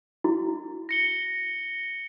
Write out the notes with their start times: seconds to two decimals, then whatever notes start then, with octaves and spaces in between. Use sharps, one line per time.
0.24 E4 F#4
0.89 A#6 C#7 G7